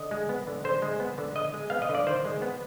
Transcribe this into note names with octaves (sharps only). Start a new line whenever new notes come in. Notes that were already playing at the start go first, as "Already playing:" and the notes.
Already playing: D3 D#5
G#3
B3
D3
D3 C5
G#3
B3
D3
D3 D#5
G#3
B3 F5
D#5
D3
D5
D#3 C5
G#3
B3